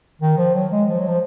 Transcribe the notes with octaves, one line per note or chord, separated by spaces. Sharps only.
D#3
F3
F#3
G#3
F3
F#3
F3